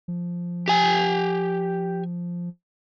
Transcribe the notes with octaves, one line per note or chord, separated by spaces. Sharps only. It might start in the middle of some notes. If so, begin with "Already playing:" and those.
F3
G4 G#5